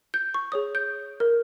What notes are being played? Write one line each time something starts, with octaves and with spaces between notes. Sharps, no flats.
G6
C#6
G#4 C#5 D#6
G6
A#4